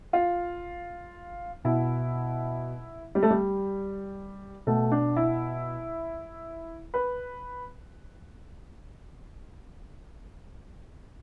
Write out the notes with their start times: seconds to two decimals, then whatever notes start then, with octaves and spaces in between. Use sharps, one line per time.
0.13 F4
1.64 B2 E4
3.15 G3
3.23 A3
3.30 G3
4.67 B2 A3
4.92 D4
5.16 E4
6.94 B4